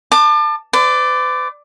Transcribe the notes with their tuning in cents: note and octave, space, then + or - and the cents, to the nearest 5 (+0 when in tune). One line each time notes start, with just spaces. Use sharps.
A5 +15 D6 +35
B4 +45 D5 +0